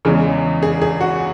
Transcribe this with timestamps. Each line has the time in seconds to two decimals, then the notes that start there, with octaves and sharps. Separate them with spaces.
0.05 E2 C#3 E3 G#3
0.63 G#4
0.82 G#4
1.01 F#4